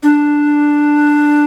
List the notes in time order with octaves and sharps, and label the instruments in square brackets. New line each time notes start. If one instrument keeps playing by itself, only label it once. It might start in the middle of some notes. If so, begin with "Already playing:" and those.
[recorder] D4